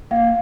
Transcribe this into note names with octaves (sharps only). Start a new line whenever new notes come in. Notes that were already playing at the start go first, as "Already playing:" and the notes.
A#3 F5